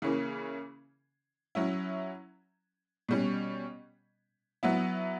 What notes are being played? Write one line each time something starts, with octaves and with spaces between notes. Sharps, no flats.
C#3 E3 A#3 C#4
F#3 C#4 E4
B2 G3 C#4
F#3 B3 E4